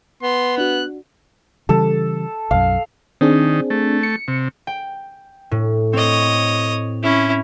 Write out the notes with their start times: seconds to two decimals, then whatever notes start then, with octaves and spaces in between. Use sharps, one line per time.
0.23 B3 C6
0.58 D4 F#4 F#6
1.69 C#3 E3 G3 A4
2.51 B1 F#2 F5
3.21 D#3 C4 D4 G#4
3.70 A3
4.03 C#7
4.28 C3
4.67 G5
5.51 A2
5.93 C4 C#5 D#5
7.03 C#4 E4